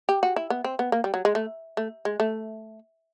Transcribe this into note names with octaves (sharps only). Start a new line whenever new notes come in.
G4
F#4
E4
B3
C4
B3
A#3
G3
F#3
G#3
A3
A3
G#3
A3